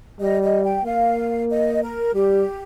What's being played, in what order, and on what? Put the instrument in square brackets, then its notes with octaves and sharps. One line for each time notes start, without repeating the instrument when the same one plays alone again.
[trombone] G3 [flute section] D#5
[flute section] D#5
G5
[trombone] A#3 [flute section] F5
[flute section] D#5
A#4
[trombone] G3 [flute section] G4